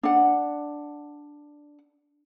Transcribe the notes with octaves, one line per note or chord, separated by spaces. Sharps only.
D4 F#5